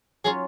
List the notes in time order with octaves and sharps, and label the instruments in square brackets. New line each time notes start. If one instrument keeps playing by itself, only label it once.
[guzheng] F#3 C#4 F4 [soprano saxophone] G#4